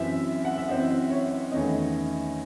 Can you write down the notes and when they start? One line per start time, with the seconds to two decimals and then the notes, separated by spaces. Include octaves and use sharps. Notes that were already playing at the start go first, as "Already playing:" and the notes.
Already playing: F#2 E3 C4 E5
0.45 F#5
0.57 E5
0.68 F#2 E3 C4 D#5
1.10 C#5
1.52 E2 D#3 A3 C#4 D#5